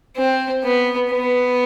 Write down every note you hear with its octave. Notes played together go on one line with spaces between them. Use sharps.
C4
B3
B3